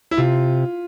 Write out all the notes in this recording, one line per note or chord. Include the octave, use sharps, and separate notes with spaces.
E4
C3 F4